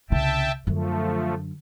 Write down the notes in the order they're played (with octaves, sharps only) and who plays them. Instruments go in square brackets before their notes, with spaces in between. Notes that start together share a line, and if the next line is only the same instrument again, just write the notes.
[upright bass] C2 C#3 [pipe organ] E5 G5 A5
[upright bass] F#2 D3 [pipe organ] F3 A3